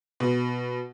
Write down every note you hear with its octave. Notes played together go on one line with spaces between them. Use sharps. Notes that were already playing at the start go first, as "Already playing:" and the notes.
B2